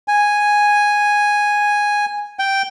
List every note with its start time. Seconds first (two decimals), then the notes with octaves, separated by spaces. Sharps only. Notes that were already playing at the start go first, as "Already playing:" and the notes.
0.08 G#5
2.39 G5